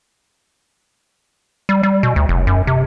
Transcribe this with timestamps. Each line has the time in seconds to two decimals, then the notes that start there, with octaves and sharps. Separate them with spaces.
1.69 G3
1.83 G3
2.03 B2
2.16 D2
2.29 F1
2.47 F#2
2.67 C3